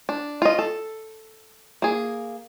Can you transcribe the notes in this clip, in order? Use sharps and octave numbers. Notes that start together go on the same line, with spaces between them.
D4
F4 D#5
A4
A#3 G#4